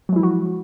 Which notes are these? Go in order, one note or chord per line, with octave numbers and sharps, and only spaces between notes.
F3 F#3 G#3 E4 F#4